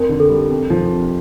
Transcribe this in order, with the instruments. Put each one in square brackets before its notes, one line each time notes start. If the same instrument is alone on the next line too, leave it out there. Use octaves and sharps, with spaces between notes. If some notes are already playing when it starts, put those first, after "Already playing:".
Already playing: [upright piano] F2 [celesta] A#4
[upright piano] D3
[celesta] A4
[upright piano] G3
F2
F3
C3